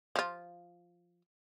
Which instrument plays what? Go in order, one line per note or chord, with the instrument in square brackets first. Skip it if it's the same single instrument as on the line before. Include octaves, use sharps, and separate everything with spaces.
[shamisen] F3 F4